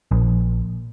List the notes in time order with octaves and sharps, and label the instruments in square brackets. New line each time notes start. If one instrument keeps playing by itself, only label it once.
[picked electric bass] A#1